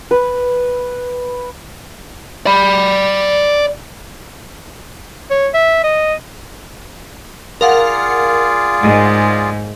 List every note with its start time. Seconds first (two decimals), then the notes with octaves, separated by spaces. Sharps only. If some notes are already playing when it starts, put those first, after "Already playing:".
0.11 B4
2.46 D5 B5
5.30 C#5
5.54 E5
5.84 D#5
7.61 F4 G#4 A#4 D5 F5 F#5
8.82 G#2 G#3